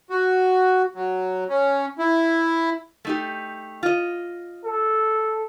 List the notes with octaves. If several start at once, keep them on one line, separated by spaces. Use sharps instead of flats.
F#4
F#3
C#4
E4
A3 D#4 G4
F4 D#5
A4